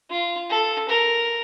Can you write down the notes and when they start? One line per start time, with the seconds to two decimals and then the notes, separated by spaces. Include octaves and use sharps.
0.10 F4
0.50 A4
0.89 A#4